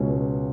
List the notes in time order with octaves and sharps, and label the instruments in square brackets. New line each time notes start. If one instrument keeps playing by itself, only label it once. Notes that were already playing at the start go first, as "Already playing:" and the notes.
Already playing: [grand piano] C#2 B2 G#3 C#4